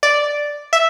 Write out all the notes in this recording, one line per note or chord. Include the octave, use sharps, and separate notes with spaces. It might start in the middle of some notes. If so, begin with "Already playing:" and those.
D5
E5